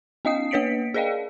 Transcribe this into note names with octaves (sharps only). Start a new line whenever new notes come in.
B3 C#4 D#5 F5 D#6 C7
A#3 B4 C#5 B6 C#7 D7
G#4 A#4 D5 D#5 F5 G5